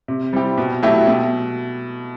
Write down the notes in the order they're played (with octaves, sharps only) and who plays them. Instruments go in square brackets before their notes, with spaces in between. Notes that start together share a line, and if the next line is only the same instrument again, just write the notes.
[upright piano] C3
G3 C4 E4 G4
B2
F#3 A3 E4 G4
B2